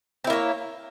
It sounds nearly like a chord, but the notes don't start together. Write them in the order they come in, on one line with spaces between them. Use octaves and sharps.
C4 E4 A#3 C#5